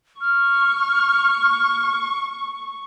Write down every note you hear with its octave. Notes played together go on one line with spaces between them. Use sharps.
C#6 F6